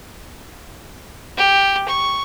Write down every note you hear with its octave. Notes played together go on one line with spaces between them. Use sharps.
G4
C#6